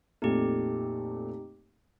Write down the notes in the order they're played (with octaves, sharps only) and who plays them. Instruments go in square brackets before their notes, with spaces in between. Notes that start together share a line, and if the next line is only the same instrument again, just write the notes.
[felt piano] F2 A#2 A3 [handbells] D#4 G4